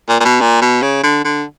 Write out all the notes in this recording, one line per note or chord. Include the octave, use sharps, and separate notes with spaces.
A#2
A#2
B2
A#2
B2
C#3
D3
D3